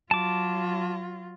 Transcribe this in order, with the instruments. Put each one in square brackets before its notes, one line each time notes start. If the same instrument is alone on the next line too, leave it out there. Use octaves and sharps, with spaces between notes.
[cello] F#3 F4 [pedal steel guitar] A5 D6